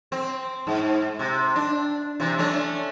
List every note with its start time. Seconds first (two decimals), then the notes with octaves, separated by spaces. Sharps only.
0.12 C4
0.67 G#2
1.19 C3
1.56 D4
2.20 C3 E3
2.38 A3 C#4 D4